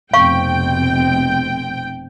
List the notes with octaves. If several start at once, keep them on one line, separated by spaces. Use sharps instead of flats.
F1 B2 C4 F5 G5 C#6